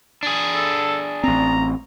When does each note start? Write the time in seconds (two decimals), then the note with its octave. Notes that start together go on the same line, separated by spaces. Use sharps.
0.23 D4 G#4
0.55 A4
1.24 A1 C4 A#5